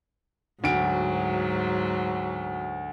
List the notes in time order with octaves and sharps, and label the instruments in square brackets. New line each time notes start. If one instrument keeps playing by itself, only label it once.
[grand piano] D2 D7 [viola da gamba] G#2 F#3